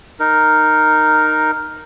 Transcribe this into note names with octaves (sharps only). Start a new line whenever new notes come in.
D#4 A#4